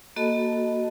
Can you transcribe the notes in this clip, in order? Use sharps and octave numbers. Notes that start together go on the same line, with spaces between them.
A#3 F#4 A4 D#5 A5 B5